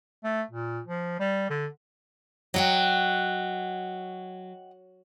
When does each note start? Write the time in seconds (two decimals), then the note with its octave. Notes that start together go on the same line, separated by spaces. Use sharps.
0.24 A3
0.51 A#2
0.87 F3
1.20 G3
1.50 D3
2.54 F#3 D#5 F#5 G5